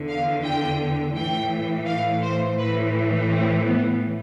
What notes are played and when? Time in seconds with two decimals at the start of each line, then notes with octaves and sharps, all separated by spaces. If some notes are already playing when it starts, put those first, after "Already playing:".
Already playing: E2 D3
0.09 F5
0.44 G5
1.16 A2 E3 G5
1.87 F5
2.22 C5
2.58 A2 E3 B4
3.30 C4
3.65 B3